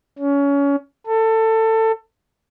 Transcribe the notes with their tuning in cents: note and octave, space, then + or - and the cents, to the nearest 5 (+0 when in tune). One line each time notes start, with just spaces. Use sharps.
C#4 +25
A4 +20